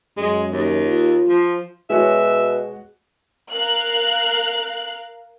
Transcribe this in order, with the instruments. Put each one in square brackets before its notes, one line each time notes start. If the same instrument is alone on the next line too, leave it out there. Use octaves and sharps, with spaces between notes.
[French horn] F#2 [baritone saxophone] G#3
[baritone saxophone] D#2
[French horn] F4
[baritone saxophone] F3
[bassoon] B2 [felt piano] G#3 F#4 C#5 [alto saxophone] E5
[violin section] A#4 F5 F#6